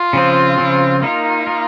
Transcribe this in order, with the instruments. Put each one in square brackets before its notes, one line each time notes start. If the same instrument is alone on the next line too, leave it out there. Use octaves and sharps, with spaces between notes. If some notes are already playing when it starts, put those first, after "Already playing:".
Already playing: [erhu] F4
[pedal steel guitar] C#3 F3 C4
C#3 F3 C4
[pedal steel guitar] A#3 D#4 A#4 [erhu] F4
[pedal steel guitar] A#3 D#4 A#4